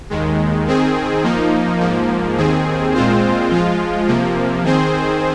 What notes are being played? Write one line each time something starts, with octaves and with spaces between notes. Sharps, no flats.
D#2 D#3 G#3
D#3 C4 G#4
F3 A#3 D#4
G#2 F3 A#3
D#2 D#3 C4 G#4
A#2 G#3 C4 F4 C5
F3 G#3 F4
C3 F3 A#3
D#3 C4 G#4 C5